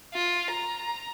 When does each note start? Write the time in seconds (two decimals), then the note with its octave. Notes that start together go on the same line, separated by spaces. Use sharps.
0.14 F4
0.50 A#5